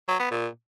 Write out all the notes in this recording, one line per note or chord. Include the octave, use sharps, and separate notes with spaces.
F#3
B3
A#2